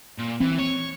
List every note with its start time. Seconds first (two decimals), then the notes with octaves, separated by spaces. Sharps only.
0.18 A#2
0.40 E3 C4
0.58 C#5